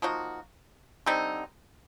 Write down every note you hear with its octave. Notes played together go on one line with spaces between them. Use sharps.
F3 A#3 D#4 F#4
D3 G3 C4 D#4